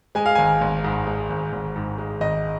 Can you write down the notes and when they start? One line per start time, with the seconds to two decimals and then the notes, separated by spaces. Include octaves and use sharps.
0.15 G#3 G#5
0.26 F5
0.35 G#1 G#5
0.61 G#1
0.84 G#2
1.07 G#3
1.30 G#1
1.53 G#1
1.76 G#2
1.98 G#3
2.21 G#1 D#5